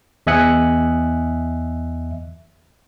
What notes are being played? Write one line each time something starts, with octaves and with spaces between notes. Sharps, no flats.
E2 D#5 E5 G#5 F#6 C#7